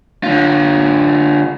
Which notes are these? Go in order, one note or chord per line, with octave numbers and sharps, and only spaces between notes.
D3 F4